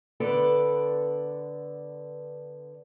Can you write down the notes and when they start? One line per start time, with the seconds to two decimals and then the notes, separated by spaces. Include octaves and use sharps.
0.20 D3 B3 A4 B4 D5